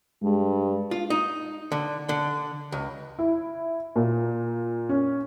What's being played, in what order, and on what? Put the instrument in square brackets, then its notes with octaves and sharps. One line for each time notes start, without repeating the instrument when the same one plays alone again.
[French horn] G2 [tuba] G#3
[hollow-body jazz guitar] F4
D#4
D3
D3
C#2
[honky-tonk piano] E4
A#2
C#4